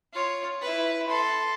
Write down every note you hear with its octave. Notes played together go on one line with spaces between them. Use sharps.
F4 C#5
E4 B4
A4 C6